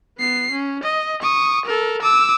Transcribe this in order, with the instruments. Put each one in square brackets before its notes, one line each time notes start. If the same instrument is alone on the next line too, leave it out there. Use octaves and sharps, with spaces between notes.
[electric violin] B3 C7
C#4
D#5
C#6 D#6
A4 A#4
D6 E6